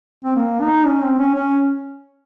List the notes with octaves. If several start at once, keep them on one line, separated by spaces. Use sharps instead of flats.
C4
A#3
D#4
C#4
C4
C#4
C#4